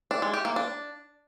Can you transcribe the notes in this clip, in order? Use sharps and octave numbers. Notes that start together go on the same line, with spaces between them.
D4
G#3
G4
A#3
D4